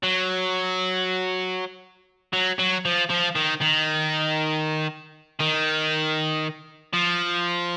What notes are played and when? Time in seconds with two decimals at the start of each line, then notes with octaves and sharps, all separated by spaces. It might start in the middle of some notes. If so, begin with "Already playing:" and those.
0.03 F#3
2.33 F#3
2.59 F#3
2.85 F3
3.10 F3
3.36 D#3
3.62 D#3
5.40 D#3
6.93 F3